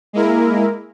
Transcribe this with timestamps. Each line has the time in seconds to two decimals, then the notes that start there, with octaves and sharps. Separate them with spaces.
0.13 G#3 A#3 E4 A#4